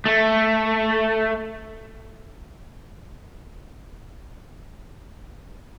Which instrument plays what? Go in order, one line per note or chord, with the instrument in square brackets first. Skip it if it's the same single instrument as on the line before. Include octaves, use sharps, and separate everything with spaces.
[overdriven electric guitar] A3